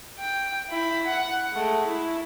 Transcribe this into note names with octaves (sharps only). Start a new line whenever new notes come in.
G5
E4 B5
F#5
G#3 A3
E4